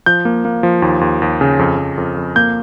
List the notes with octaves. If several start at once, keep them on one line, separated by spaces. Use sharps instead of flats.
F3 G6
A#3
A#3
F3
D#2
D#2
D#2
C#3
F2
F2
F2
F2
A#3 G6